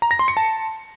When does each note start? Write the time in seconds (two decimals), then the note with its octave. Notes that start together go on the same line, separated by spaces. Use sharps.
0.02 A#5
0.11 A#6
0.19 C6
0.28 C#7
0.37 A5